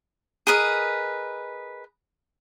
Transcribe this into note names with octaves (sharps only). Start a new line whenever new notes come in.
G#4 A#4 B4 D#5